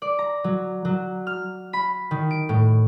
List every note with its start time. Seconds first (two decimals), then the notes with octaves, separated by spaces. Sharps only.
0.02 D5
0.19 A#5
0.44 F#3
0.85 F#3
1.27 F6
1.73 B5
2.11 D#3
2.31 D7
2.49 A2